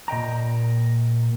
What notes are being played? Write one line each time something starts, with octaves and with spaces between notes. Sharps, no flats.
A#2 D#5 G5 A#5